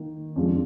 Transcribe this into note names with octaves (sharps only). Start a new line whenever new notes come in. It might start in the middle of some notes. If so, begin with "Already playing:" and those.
Already playing: D#3 A#3 D#4
F2 C3 F3 G#3 D4